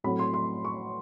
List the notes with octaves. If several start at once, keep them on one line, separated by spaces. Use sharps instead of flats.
A2 F#3 A3 C4 B5
C6
C6
C#6